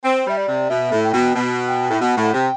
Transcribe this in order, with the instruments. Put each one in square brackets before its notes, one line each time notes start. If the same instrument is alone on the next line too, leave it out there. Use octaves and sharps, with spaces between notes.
[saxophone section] C4 [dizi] C5
[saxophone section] G3 [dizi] E5
[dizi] D5
[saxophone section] C3
[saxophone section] B2 [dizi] E5
[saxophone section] A2
[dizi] G5
[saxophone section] B2
B2
[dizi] G5
[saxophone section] A2
[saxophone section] B2 [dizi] F#5
[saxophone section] A2
[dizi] F#5
[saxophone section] C3 [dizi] G5